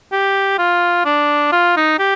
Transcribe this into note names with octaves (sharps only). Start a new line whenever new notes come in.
G4
F4
D4
F4
D#4
G4